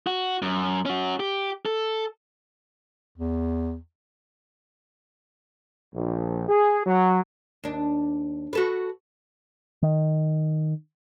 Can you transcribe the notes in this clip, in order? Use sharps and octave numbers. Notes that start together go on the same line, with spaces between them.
F#4
F#2
C#4 F#4
G4
A4
E2
A#1
G#4
F#3
D#2 D4
F#4 A4 B4
D#3